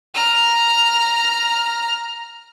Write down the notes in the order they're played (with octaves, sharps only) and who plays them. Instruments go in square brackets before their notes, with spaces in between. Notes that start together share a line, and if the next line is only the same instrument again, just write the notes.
[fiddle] A#5 F6